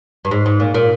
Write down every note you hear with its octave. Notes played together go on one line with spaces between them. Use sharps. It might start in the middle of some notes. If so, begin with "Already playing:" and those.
G2
G#2
G#2
A#2
A#2